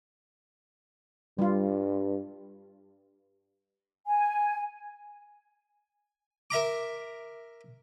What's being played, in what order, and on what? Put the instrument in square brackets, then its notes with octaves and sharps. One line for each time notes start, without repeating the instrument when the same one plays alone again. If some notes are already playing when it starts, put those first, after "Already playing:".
[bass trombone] G2 [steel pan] G3 F4
[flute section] G#5
[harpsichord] A#4 E5 A#5 D6